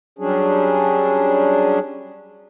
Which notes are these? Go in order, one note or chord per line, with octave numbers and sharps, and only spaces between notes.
F#3 G3 C#4 D4 G#4